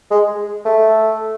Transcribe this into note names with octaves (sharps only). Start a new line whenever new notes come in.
G#3
A3